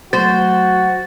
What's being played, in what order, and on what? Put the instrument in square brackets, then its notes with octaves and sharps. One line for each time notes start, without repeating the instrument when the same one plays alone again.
[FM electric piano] F#3 A3 [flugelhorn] F#4 [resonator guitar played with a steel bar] C5 [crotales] A6